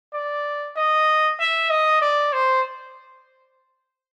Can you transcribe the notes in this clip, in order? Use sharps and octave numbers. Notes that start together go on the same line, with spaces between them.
D5
D#5
E5
D#5
D5
C5